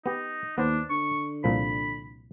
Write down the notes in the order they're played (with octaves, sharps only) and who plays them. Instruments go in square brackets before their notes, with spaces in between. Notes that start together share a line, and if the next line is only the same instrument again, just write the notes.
[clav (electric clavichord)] B3 G4 [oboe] D#4
[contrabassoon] D#2 [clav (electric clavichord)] B3 C5 [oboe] D4
[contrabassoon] D3 [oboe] C#6
[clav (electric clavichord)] C2 A#2 F3 [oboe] B5